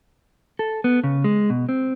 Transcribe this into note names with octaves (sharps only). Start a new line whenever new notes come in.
A4
B3
C#3
G#3
B2
C4